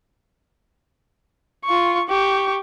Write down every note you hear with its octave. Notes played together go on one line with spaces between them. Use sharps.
F4 C#6
G4 C#6